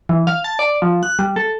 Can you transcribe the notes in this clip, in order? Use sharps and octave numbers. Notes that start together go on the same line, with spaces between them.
E3
F5
A5
D5
F3
F#6
G3
A4